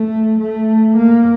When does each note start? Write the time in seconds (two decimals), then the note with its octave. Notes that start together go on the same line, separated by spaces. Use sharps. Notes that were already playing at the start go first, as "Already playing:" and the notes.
Already playing: A3
0.39 A3
0.97 A#3